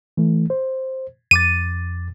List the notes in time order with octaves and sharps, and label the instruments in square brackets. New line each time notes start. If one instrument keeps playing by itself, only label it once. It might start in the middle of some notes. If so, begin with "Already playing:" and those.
[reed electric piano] E3 A3
C5
[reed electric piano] F2 D6 A6 [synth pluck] D#7